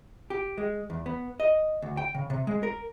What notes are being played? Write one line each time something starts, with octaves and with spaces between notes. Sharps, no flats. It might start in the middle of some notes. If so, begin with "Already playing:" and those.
G4
G#3
E2
B3
D#5
D2
G5
C#3
C3
G#3
A#4